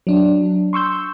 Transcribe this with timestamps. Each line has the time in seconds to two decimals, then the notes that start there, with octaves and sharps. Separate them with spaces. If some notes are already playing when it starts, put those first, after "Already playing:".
0.07 F#3 D4
0.73 C6 C#6 E6 G6